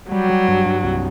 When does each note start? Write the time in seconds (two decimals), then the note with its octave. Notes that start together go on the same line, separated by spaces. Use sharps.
0.11 F#3 G3
0.30 G3
0.48 G2
0.66 G2
0.84 C2